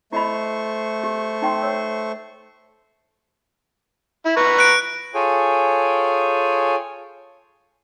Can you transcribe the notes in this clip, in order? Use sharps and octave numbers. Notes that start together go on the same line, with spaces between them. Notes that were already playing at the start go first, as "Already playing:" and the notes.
A3 E4 C5 D#5 B5 C#6
G4
D#4 G5 C6
C#5 E6
E4
B4 A#5 C#6
F#6 D7
F4 G#4 A4 C#5 G5 G#5